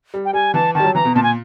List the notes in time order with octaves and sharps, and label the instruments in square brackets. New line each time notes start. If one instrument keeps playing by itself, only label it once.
[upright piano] G3
[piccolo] G5
[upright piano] G3 [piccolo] G#5
[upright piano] E3 [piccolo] A5
[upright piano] D#3 [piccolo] A5
[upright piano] G3
F#3
[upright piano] E3 [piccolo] A#5
[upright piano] B2
[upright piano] A#2 [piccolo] A5
[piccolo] G#5